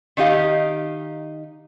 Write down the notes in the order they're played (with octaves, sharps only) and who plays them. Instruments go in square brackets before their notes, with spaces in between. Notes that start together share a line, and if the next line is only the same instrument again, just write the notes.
[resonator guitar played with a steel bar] D#3 D#4 G4 F5